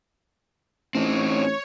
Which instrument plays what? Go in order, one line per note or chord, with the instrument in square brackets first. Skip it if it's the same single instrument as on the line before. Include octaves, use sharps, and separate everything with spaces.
[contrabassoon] A1 [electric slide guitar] C4 D#4 [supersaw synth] C#5